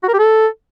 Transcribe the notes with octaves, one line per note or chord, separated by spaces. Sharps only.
F#4
A#4
G4
A4